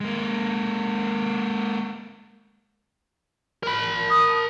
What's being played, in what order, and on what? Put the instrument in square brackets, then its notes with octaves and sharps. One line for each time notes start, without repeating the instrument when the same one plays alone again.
[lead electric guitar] G#3 A#3
[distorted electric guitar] A#4 B5
[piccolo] D#6